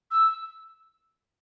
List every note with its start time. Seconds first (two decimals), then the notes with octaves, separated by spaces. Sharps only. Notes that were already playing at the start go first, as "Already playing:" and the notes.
0.11 E6